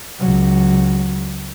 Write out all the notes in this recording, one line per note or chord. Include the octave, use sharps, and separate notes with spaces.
C#2 F#3